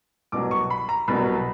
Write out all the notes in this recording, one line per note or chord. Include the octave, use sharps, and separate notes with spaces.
C2 B2 F#3 D6
C#6
B5
A#5
C2 B2 F#3 B5